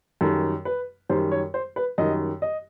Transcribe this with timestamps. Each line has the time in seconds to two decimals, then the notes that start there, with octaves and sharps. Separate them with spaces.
0.21 F#2 D#3 G3 A4
0.65 B4
1.09 F#2 D#3 G3 C5
1.31 C#5
1.54 C5
1.76 B4
1.98 F#2 D#3 G3 D#5
2.42 D#5